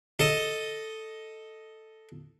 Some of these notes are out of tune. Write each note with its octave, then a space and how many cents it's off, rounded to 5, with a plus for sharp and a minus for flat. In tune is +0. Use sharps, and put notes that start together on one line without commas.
A4 +0 D#5 +5